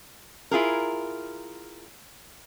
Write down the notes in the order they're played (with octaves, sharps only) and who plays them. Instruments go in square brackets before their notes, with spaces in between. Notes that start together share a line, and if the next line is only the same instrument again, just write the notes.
[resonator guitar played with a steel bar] E4 F4 G#4 A#4